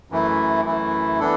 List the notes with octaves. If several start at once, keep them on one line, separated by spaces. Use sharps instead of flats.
F#2 E3 A3 E4
F#2 E3 A3 E4
E3 B3 D4 A4